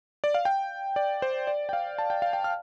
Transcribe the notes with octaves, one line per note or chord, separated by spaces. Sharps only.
D5
F5
G5
D5
C5
D5
G5
F5
A5
G5
F5
G5
F6